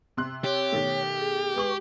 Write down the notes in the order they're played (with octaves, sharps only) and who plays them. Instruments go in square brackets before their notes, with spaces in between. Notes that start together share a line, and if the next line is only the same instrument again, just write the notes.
[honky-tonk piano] C3 C6 F#6
[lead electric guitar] G4 [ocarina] C#5
[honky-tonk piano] B2 D#3 A3
[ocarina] G#4
[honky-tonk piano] G#3 C#6 F#7 [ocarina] B4